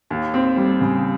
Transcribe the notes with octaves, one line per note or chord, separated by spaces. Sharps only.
D#2
C4
G3
C#3